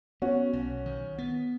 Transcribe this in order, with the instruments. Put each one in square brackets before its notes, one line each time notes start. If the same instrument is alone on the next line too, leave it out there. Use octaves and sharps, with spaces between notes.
[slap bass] B3 [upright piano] C#4 F#4
[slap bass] B1
D#3
B3